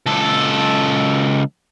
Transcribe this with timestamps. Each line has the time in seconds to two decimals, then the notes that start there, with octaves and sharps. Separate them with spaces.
0.06 C#2 A4